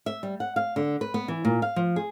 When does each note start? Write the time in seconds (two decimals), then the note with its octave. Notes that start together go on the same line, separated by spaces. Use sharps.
0.06 E5
0.23 G3
0.40 F#5
0.56 F5
0.76 D3
1.01 B4
1.14 B3
1.28 E3
1.45 A#2
1.62 F5
1.76 F3
1.96 G#4